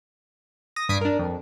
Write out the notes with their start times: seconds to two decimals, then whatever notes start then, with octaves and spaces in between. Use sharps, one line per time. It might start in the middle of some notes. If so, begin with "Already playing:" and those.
0.76 D#6 A#6
0.89 G2 D#6 G#6 B6 C7 D7
1.01 D4 A#4
1.19 F2